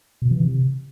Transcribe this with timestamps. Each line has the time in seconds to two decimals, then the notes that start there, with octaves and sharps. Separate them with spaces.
0.22 B2
0.31 E3
0.40 C3